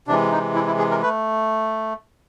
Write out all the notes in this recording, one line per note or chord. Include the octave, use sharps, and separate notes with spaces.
C3 E3 G#3 D4
D#4
E4
E4
G#4
A#4
A3 B4